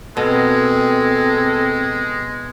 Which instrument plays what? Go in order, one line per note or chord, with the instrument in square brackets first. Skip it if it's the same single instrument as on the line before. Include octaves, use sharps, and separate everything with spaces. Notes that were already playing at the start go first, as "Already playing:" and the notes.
[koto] B2 [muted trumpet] G#3 [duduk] C4 [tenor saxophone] A4